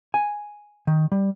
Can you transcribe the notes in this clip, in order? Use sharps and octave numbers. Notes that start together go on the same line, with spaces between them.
G#5
D#3
G3